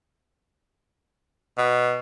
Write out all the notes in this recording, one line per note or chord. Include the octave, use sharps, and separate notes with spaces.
B2